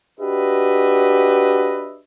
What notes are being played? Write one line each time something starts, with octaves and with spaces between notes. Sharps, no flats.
D4 F#4 G4 B4 D#5 E5